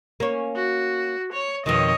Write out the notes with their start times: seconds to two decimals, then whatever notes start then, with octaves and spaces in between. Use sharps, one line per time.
0.20 A#3 C#4
0.55 F#4
1.33 C#5
1.66 F2 B2 D#3 C#5 D#5